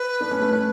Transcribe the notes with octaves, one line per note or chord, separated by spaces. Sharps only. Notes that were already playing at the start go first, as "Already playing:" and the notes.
Already playing: B4
B3 D4
A3 C#4
A3 C#4
A3 C#4